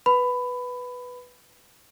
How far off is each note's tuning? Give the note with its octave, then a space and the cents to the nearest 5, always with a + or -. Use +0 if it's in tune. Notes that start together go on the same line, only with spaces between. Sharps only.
B4 +0 B5 +15